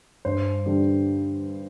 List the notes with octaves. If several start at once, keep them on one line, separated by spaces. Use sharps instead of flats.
G2 C5
D3 G3